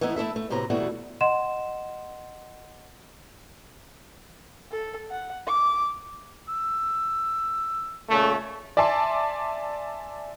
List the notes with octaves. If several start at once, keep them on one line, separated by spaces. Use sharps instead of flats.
E3 A3 B3 D#4 E4
A3 E4 A4 E5
A3
A2 C3 F#3 B3 A#5
B2 E3 G3 A3 F#4 G#4
D#5 F#5 C6 E7
A4
F#5
D6
E6
A#2 C#3 A3 C#5
D5 E5 G#5 A5 C6 D6